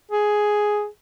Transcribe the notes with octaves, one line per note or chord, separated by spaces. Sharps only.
G#4